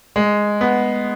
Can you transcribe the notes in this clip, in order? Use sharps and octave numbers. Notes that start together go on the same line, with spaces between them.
G#3
B3